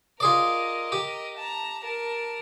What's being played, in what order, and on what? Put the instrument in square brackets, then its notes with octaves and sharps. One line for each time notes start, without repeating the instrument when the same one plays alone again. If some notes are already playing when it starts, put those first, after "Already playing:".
[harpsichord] F4 G#4 D5 [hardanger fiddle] A#4 D#5
[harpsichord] G4
[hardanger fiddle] A5 A#5
A#4 A5